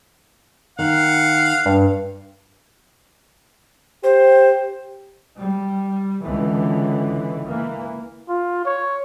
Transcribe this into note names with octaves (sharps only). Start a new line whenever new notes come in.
D#3 F5 F#5
G2
G4 C5
G3
C#2 D3 E3
E3 A#3
F4
C#5